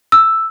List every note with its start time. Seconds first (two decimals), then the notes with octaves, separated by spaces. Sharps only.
0.12 E6